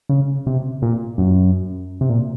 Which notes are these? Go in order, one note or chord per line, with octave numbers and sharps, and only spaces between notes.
C#3
C3
A#2
F#2
C3
A#2